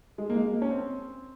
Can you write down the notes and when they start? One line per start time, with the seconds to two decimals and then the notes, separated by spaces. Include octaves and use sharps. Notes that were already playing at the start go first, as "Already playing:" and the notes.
0.18 G#3
0.30 A#3
0.36 G#3
0.53 A#3
0.62 C#4
0.70 C4